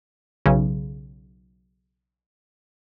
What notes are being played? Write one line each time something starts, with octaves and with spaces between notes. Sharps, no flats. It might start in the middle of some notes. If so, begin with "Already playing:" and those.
B1 C#3